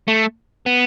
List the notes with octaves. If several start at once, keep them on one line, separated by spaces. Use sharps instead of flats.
A3
B3